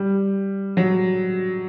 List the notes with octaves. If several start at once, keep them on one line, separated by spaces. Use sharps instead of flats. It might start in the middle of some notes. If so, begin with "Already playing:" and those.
Already playing: G3
F#3